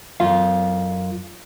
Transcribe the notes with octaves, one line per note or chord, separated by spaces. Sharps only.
F#2 F4 F5